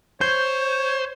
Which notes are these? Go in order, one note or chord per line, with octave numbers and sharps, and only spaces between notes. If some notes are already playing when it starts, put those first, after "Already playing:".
C5 C#5 G6